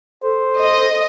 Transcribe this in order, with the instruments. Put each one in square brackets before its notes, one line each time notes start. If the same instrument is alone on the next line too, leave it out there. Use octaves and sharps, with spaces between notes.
[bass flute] A4 [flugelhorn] C5
[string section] D#5